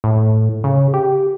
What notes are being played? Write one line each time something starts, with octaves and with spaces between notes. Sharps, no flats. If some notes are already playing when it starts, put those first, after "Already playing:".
A2
C#3
G4